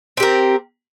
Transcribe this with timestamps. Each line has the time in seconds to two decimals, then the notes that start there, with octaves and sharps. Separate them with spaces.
0.17 C4
0.20 G4
0.23 A#4